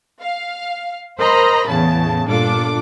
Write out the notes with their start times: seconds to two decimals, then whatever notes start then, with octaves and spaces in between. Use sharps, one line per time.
0.22 F5
1.18 A#4 C5 D#5 A#5 B5
1.68 E2 A2 C#3 A5
2.26 G1 A#2 D4 F4 A4 D6